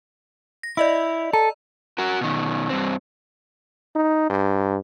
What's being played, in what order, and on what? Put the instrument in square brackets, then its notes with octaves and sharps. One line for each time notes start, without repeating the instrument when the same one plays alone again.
[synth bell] A#6
[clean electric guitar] E4 [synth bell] D5 D#5 E6
[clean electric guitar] A4 [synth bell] A#5
[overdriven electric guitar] F#4 A#4
B2 D#3
G2 C4
[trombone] D#4
G2